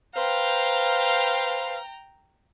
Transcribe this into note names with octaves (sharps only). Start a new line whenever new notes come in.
B4 C5 F5 G5 A#5